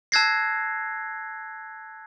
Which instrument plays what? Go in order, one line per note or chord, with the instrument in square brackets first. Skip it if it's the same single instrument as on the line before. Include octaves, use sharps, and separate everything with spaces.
[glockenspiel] A5 E6 F#6 G#6 A#6 C7